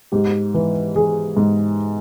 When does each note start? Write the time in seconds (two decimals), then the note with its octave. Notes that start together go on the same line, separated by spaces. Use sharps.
0.12 G#2 G4
0.54 E3
0.95 E3 G#4
1.37 G#2